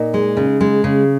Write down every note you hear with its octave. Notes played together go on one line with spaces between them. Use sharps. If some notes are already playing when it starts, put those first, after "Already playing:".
Already playing: A#2 D#4 D#5
G#3
C#3
G#3
C#3